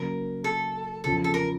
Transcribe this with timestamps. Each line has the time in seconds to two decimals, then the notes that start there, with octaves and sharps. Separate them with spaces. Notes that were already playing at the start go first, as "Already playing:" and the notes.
Already playing: C#3 F#3 A#3 A#4
0.44 A4
1.04 E2 C#3 F3 A4
1.24 A4
1.34 A#4